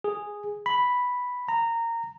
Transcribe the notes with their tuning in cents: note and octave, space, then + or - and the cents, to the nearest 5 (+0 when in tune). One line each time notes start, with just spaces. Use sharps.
G#4 -5
B5 +0
A#5 -15